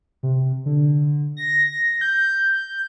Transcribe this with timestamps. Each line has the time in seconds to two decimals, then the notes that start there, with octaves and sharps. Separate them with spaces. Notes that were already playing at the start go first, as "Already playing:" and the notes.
0.23 C3
0.66 D3
1.37 A#6
2.01 G6